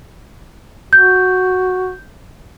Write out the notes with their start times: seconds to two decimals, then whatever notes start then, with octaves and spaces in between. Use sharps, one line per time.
0.93 F#4 G6